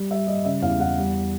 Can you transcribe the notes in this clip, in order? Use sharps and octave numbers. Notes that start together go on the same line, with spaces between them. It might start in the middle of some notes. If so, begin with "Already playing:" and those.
Already playing: G3
G3 E5
G3 D#5
C#3 E5
E2 F5
E2 F#5
G3